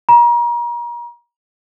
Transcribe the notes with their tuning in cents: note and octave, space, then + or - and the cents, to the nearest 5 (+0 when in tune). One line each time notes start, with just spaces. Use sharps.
A#5 +35